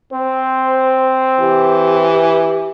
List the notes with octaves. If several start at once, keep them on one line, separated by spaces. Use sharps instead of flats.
C4 C5
E3 G4